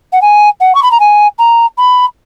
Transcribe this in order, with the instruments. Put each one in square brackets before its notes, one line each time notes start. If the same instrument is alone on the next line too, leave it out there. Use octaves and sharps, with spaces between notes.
[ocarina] F#5
G#5
F#5
C#6
B5
A#5
G#5
A#5
B5